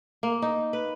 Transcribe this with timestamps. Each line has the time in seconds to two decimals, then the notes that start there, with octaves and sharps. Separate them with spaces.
0.23 A#3
0.42 D#4
0.73 B4